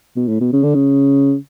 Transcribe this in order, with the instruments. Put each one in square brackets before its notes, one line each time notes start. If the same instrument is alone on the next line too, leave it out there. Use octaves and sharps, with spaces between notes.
[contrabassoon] B2
A2
B2
C#3
D3
C#3